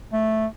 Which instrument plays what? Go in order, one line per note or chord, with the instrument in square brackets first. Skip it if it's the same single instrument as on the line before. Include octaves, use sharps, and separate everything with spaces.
[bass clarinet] A3